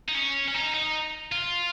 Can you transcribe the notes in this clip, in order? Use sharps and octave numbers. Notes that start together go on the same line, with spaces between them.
D#4
C#4
C#4
D#4
D#4
F4